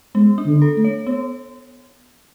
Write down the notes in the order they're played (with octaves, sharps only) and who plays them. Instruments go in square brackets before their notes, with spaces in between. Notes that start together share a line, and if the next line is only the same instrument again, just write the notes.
[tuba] G#3 [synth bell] B3
[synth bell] D4
[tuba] D3
[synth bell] A4
[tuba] A3
[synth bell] C#5
B3